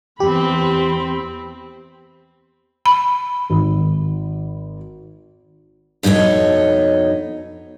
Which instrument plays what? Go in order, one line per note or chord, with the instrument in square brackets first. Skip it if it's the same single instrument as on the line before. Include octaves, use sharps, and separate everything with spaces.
[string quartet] E2 [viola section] C4 B5 [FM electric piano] G4
[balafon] B5
[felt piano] G#1
[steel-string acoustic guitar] F2 B2 D#4 F#4 C#5